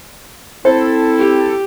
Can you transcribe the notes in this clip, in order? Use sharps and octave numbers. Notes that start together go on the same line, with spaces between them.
C4 E4 A4 C5
G4